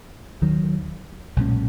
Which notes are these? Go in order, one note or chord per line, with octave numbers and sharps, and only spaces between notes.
D#2 D#3 F#3
B1 A#2 G#3 C#4